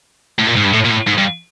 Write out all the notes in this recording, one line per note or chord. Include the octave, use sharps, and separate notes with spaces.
A2
A#2
G#2
G2
A2
A#2
A2
G#2
G2